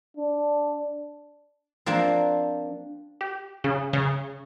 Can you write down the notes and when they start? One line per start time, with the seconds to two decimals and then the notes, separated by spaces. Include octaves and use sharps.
0.17 D4
1.86 F3 A#3 C4 D4
3.21 G4
3.64 C#3
3.93 C#3